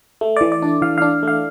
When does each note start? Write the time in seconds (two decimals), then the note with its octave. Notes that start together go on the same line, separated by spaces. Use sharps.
0.21 A3
0.37 E3 D5
0.52 D5
0.62 D4
0.82 E3 F5
0.98 D4 F5
1.23 A3 F5